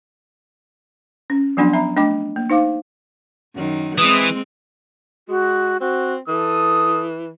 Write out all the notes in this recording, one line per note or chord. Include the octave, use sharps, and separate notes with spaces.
C#4
F3 F#3 B3 D4 F#5 C6
B3 E5 A#5 B5
A3 D4 D#5 G5 D6
A#3
D#4 C5 F5 D6
F#2 D#3
E3 G#3 C4 D#6 D7
G#3 F#4
C4 F#4
E3 A4 D#6